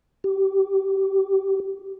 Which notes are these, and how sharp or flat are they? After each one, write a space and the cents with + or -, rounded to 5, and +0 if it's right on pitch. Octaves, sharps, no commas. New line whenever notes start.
G4 -20